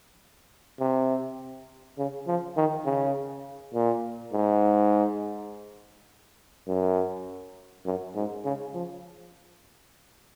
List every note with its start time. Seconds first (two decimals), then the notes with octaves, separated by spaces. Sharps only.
0.80 C3
1.98 C#3
2.27 F3
2.56 D#3
2.85 C#3
3.74 A#2
4.33 G#2
6.68 F#2
7.85 F#2
8.15 G#2
8.44 C#3
8.74 F3